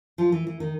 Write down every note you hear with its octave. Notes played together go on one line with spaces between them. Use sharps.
F3
E3
E3
D#3